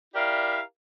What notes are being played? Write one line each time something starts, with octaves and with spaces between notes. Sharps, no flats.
E4 G4 A#4 D5 E5 F5